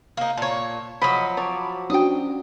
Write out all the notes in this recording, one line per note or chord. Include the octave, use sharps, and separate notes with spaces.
A#3 D#4
A#2 C#5 A5
F3 F#3 D#5 B5
C#5 A5 B5 D6
C#4 D4 F#4 G5 D#6